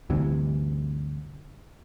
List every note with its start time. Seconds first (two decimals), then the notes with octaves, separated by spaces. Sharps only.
0.10 D2 G2 C3 E3